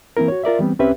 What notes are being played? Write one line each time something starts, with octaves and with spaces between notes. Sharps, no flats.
E3 A#3 C4 E4 A#4
F#4 C#5
F4 A#4 D5 E5
E3 G3 B3 C4
C2 C4 C#4 G4 B4 E5